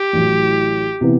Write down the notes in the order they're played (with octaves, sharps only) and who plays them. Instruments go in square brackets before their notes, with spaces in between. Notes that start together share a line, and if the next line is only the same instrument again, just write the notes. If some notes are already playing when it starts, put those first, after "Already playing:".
Already playing: [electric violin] G4
[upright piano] A1 A2 F#3
C3 E3 B3